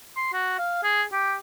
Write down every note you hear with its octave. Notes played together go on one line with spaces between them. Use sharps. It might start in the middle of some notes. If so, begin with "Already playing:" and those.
C6
F#4
F5
G#4
G4